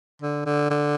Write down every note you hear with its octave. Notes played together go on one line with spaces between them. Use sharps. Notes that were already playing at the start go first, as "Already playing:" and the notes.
D3
D3
D3